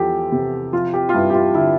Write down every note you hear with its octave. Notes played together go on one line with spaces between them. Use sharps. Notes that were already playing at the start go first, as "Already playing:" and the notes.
Already playing: E2 F3 G4 A4
C3
F3 F4
G4
F4
G2 E4
G4
F4
D3 E4